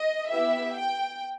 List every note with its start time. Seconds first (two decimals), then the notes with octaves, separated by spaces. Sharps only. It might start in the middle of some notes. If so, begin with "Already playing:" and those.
Already playing: D#5
0.30 B3 E4 G4 E5
0.75 G5